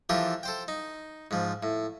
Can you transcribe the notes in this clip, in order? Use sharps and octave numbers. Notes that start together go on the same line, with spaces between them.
E3 F3 F4 G4 A4 A#4
A4 C5 G5
D#4
G#2 F3
A2